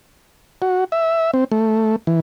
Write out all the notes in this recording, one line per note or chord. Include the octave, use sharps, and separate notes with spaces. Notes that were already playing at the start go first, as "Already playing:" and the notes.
F#4
E5
C4
A3
E3